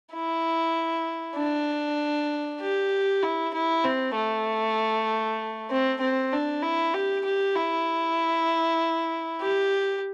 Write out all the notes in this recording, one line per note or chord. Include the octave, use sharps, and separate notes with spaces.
E4
D4
G4
E4
E4
C4
A3
C4
C4
D4
E4
G4
G4
E4
G4